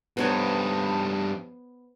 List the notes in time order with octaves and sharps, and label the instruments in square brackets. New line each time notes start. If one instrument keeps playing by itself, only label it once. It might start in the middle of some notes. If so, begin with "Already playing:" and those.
[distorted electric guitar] G2 D#4 [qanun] B3 C5 C#5